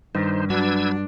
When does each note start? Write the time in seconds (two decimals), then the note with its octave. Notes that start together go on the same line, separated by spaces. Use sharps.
0.15 G2 D#3 D#4 C5
0.50 F#3 D4 F#4 B4 E6 G#6